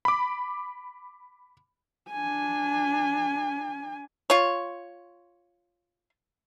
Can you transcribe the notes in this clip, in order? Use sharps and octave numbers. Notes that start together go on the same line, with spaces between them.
B5 D6
D4 G#5
F4 C#5